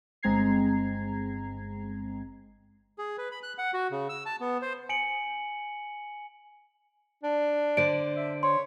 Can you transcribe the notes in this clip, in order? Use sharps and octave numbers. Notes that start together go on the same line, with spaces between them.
G1 G#3 C4 A#5 G#6 C7
G#4
B4
B5
F#6
F#5
F#4
C#3
E6
A5
B3
C5
G#5 C#7 D7 F#7
D4
D3 C5 D5 D7
E5
C#5 C6